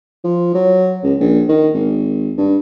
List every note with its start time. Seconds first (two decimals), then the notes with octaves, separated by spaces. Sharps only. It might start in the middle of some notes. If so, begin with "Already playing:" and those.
0.24 F3
0.55 F#3
1.03 C#2
1.20 A#1
1.49 D#3
1.74 G#1
2.37 G2